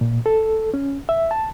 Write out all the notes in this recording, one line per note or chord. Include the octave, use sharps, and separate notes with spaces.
A#2
A4
C#4
E5
A5